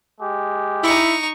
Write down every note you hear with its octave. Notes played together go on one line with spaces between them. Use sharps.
G#3 G4
D#4 E4 C#6